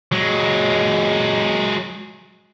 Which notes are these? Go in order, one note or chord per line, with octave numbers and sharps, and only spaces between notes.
F#3 G#3